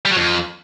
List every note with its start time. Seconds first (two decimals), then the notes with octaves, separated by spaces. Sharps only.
0.05 G3
0.11 F#3
0.17 F2